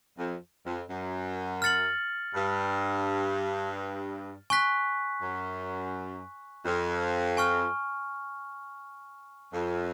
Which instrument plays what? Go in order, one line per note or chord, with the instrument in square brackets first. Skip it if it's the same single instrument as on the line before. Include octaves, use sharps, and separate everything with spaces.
[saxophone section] F2
F2
F#2
[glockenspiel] F6 A6 C#7 F#7
[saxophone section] G2
[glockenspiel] G#5 C#6 F#6 B6
[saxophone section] F#2
F2
[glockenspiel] G#5 C#6 F6
[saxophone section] F2